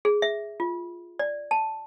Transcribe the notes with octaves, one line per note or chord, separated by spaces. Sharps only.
G#4
E5
F4
D5
A5